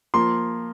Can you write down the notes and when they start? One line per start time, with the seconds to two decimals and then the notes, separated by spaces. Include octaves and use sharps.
0.14 F3 A#3 C6